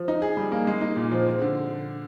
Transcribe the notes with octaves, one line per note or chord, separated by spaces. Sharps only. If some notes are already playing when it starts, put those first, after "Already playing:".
Already playing: F3
D#4
G#4
G3
A#3
G#3
D#4
A#2
F3
C4
D3